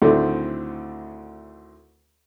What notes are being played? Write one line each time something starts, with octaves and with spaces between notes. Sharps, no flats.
D2 A2 D3 D#3 A3 C4